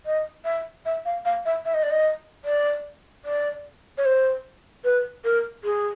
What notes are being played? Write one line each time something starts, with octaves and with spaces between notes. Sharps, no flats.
D#5
E5
E5
F5
F5
E5
E5
D#5
D5
D#5
D5
D5
C#5
C5
B4
A#4
G#4